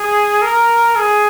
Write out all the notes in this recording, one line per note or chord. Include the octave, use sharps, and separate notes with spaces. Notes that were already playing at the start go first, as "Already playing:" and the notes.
Already playing: G#4
A#4
G#4